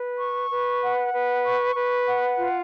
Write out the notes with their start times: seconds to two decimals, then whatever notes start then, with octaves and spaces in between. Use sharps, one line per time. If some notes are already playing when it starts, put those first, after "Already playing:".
Already playing: B4
0.19 C#6
0.50 B4
0.82 F#5
1.14 B4
1.45 C#6
1.76 B4
2.08 F#5
2.39 F4